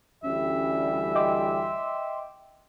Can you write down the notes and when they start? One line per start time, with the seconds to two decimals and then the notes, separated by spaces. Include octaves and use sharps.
0.23 D2 E3 G3 C#4 E5
1.15 D#5 G5 C6 D6